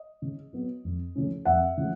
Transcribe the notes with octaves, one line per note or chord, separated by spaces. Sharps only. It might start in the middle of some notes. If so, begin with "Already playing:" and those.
Already playing: D#5
C#3
F#3 B3
F2
C#3 F3 A3 C#4
F2 E5 F#5
C#3 F3 A3